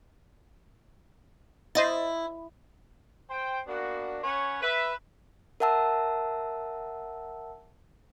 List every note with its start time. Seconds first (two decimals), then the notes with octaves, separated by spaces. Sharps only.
1.75 E4 C5 D#5 A6
3.30 C5 G5
3.67 A#3 B3 D4 F#4
4.24 C#4 B4 C#5 F#5 G#5
4.62 B4 E5
5.60 A#4 E5 F#5 A5 E6